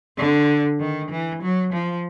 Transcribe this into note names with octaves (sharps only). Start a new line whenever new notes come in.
D3
D#3
E3
F#3
F3